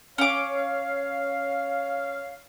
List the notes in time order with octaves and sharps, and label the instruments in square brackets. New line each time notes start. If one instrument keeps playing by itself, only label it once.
[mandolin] C#4 D6 [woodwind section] C#5 F5